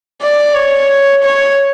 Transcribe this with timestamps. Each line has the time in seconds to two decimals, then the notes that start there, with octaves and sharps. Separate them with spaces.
0.21 D5
0.54 C#5
1.23 C#5